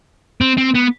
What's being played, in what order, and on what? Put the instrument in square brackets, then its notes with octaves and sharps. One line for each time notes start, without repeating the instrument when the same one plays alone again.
[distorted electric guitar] C4
C4
B3